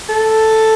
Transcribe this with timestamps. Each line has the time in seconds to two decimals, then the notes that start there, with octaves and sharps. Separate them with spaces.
0.09 A4